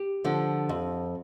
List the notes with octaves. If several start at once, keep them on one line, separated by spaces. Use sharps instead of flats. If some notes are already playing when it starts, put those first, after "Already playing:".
Already playing: G4
D3 F3
F2